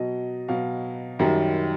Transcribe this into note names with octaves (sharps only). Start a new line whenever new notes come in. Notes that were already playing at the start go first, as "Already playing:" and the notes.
Already playing: B2 F#3 D#5
B2 F#3 F5
F#2 D#3 G3